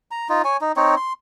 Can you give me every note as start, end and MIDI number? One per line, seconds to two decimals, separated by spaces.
0.11 0.27 82
0.29 0.42 63
0.29 0.42 65
0.44 0.57 73
0.44 0.57 80
0.61 0.72 63
0.76 0.95 60
0.76 0.95 63
0.76 0.95 73
0.97 1.13 84